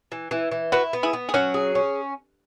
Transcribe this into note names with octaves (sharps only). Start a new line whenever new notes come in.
E3
E3
E3
E4 F#4 B4
B3
E4 G#4
B3
G#4
F#3 C#4 F#4
G#4
C#4